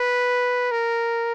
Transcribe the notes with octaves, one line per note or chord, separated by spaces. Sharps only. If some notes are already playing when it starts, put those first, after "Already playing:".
Already playing: B4
A#4